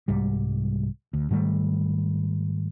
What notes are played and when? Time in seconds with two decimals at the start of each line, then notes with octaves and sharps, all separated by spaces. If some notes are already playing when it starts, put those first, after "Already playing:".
0.08 C2 G#2 G3
1.13 D2
1.31 G#2 D#3 G3 A3